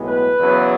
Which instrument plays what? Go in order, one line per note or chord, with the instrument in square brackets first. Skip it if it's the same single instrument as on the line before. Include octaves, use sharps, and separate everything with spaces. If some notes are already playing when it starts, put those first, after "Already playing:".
Already playing: [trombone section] B1 A2 G#3 B3
B4
E2 C#3 F#3 B3